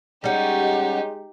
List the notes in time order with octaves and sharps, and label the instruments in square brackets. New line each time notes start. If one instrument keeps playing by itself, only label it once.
[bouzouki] G3 C#4 [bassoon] G#3 [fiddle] D#4 G4 [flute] F#5